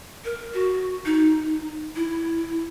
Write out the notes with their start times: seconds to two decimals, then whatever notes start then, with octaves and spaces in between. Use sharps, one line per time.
0.25 A#4
0.54 F#4
1.06 D#4
1.96 E4